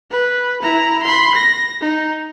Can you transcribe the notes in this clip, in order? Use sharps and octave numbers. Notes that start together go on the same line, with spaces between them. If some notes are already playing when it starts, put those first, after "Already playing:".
B4
E4 A#5
B5 C6
A#6
D#4